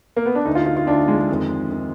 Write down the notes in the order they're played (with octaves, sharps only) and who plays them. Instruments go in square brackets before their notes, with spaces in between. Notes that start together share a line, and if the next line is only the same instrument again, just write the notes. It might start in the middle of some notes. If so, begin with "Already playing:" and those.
[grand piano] A#3
B3
D4
D2 D3 D#4
F4
F4
F4
D2 D3 D4
G#3
G#3
F2 D#3
D#3